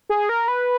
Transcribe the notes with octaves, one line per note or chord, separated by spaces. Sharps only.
G#4
A#4
B4